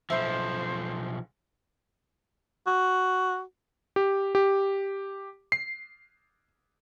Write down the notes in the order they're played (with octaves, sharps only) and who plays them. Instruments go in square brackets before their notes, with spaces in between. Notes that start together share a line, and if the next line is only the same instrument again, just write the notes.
[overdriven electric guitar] B1 F3 [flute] C5 [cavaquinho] E5 B5
[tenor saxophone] F#4
[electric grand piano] G4
G4
C7